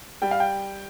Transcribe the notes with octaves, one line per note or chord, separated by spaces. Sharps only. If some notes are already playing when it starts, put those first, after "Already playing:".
G3 G5
F5
G5